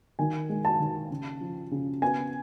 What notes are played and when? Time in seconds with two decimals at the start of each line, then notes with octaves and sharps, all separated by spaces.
0.19 D#3 G#5
0.49 G#3
0.65 A5
0.80 D#3
1.11 C#3
1.41 F3
1.71 C#3
2.02 B3 G#5